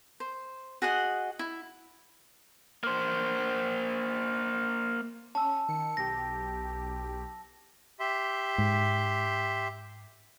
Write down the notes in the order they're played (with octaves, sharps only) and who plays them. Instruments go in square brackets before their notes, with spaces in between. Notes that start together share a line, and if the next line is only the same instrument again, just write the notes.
[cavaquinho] C5
F#4 G#4 D#5 F#5
E4
[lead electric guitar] A#3 C5
[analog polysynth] C#4 [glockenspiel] A5 E6
[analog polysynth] D#3 C#7
[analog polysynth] B1 G4 [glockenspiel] A#6
[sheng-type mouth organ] G4 E5 C6
[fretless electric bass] G#2